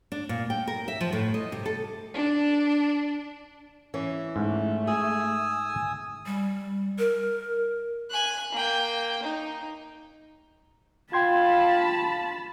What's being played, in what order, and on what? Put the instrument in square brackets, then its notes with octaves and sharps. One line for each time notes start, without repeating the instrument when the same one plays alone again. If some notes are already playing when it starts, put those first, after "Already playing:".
[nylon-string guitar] D4
A#2
G5
A#4
E5
F3
A2
D#5
C3
A4
[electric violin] D4
[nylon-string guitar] E3 C#4 E4
[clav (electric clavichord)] G#2 [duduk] A3
[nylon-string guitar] G#4 [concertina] G#5 D#6 E6
[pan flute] G3
A#4
[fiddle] G#5 F#6
A#3 G5
D#4
[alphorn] F4 [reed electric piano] G5 C6 G#6 [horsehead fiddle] A5 B5